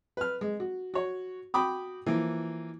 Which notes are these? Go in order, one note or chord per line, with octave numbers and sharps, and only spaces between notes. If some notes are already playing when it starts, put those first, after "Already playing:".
B4 F6
G#3
F#4
F#4 C#5
F#4 G5 B5 D6 D#6
E3 F3 A#3